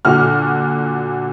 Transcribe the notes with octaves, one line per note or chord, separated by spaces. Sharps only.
A#2 D3 F#4 F6